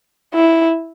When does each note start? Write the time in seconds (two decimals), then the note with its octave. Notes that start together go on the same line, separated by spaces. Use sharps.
0.34 E4